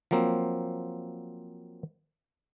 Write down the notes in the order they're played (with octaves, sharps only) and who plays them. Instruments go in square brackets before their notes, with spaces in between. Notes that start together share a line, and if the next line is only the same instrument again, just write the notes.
[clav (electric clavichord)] F3 F#3 A#3 C4